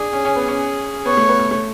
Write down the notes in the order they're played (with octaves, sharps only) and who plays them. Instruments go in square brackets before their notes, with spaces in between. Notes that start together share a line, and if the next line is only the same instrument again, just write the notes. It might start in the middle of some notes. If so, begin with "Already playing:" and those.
Already playing: [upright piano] D4 [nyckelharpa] G#4
[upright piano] C#4
C#4
B3
C#4
[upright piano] B3 [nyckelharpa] C#5
[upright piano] A3
B3
A3
A3